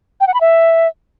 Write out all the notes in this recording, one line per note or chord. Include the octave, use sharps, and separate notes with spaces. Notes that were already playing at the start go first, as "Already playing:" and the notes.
G5
F#5
B5
E5